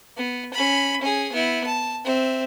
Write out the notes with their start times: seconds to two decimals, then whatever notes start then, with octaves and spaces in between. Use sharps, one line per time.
0.17 B3
0.53 C#4 B5
1.00 C#4 G#4
1.32 B3 E4
1.66 A5
2.04 C4 E5